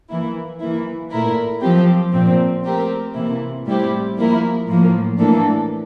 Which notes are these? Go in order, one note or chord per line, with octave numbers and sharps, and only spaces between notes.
E3 A#3 E4
E3 A#3 E4
A#2 A3 E4 A#4
F3 C4 G4
A#2 F3 C4
A3 C4 G4 A#4
C3 E3 A#3 E4
A2 G3 C4 E4 G4
F3 A#3 E4 A#4
A2 F3 A#3
A2 E3 A#3 D4 A4